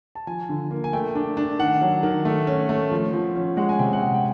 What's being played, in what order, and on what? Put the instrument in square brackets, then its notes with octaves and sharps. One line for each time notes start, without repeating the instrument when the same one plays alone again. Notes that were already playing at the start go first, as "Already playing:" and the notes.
[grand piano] A5
F3 G#5
D3
A#3
G#5
A3 G5
D4
D4
D#3 F#5
F#3
D#3
A3
C#4
A3
F3
F3
C#4
G#3 F#5
G#5
C3 G5
F#5
G#3 G5
G5